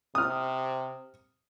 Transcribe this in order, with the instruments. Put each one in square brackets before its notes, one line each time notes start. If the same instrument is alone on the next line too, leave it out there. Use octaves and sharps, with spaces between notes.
[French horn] C3 [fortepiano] D#6 F6